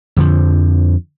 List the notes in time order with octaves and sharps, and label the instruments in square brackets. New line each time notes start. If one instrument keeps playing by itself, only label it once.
[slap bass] F2 D3 F3